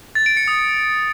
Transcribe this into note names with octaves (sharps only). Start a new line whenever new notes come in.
A6
D7
C#7
D#6